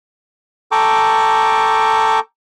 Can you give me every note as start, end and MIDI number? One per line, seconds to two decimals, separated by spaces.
0.72 2.19 69
0.72 2.19 79
0.72 2.19 81
0.72 2.19 82
0.72 2.19 85
0.72 2.19 86